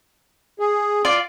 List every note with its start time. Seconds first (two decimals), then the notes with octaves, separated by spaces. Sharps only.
0.59 G#4
1.05 F4 D5